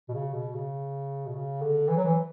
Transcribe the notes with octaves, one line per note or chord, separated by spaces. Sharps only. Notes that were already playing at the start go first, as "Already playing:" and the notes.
B2
C#3
B2
C#3
B2
C#3
D3
E3
F#3
E3